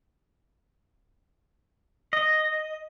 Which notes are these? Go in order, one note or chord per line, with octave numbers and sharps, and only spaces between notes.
D#5